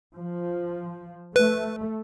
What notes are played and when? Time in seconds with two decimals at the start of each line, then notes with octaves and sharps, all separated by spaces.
0.18 F3
1.36 A3 B4